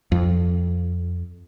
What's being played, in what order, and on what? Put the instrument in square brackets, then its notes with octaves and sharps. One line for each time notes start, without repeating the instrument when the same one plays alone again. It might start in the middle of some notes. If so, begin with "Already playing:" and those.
[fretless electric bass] F2